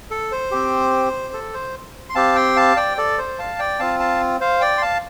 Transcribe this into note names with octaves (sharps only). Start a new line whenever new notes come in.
A4
C5
C4 G4
A4
C5
C6
C4 G4 F5 A5
G5 C6
F5 A5
D5 G5
A4 D5
C5
F5 A5
D5 G5
C4 F4 F5 A5
F5 A5
C5 F5
D5 G5
C6
F5 A5